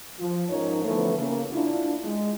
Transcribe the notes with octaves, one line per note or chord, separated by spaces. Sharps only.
F3
G#2 F3 C#4 D#4 A#4 C#5
D3 E3 F3 A3 B3 C#4
C#3 A#3
D4 E4 F4
G#3